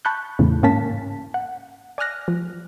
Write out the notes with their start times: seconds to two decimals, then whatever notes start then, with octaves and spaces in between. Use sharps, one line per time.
0.05 A5 B5 C#6 F#6 G6
0.39 E2 A2 C#3
0.63 G#2 A#3 C#4 F5 A5 B6
1.34 F#5
1.98 D5 G#5 D#6 F6 F#6 A#6
2.28 F3